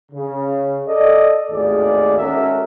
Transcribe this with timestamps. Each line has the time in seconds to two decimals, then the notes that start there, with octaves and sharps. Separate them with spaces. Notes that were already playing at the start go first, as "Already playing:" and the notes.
0.12 C#3
0.87 A4 D5 D#5
1.51 G#1 D#2 A2 G#4 D5
2.18 G#3 C#4 F#4 A4 A#4 E5